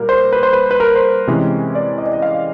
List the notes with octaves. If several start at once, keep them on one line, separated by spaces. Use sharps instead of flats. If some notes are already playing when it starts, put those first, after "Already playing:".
Already playing: A#2 G3 A#3 A#4
C5
B4
C5
B4
B4
A#4
C5
C3 E3 G#3 C#4
D5
D#5
D5
D#5
F5